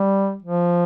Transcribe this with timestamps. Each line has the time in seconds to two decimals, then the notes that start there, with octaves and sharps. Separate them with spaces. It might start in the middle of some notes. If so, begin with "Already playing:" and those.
Already playing: G3
0.43 F3